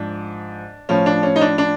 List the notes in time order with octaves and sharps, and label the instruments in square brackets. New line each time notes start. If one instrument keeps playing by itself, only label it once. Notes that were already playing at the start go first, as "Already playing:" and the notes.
Already playing: [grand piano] G#2 F3 D4
A2 F3 C#4
D4
C#4
D#4
D4
D4